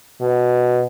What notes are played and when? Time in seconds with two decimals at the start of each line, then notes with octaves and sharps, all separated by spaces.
0.21 B2